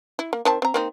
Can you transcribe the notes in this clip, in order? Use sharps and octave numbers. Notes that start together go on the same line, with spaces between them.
E4
A#3
D#3 C4 A5
C4 A#5
A#3 C4 D#4